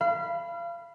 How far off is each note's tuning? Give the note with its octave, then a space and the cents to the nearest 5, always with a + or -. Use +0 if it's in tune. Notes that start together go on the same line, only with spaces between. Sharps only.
F5 -30 B5 +0